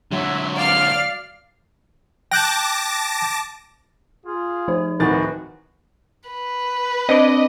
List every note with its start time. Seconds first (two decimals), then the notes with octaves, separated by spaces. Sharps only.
0.12 D3 F#3 G#3 E5
0.56 D5 F5 F6
2.31 G5 A5 D6 F#6 G6 A#6
4.25 F4 G#4
4.68 F3 D#4 C5
5.00 D1 D#3 F#4 B4 A6
6.29 B4
7.09 C4 D4 D#5 D6